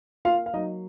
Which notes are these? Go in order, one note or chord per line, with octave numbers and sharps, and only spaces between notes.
A#3 F4 F5
F5
F#3 D#4 D#5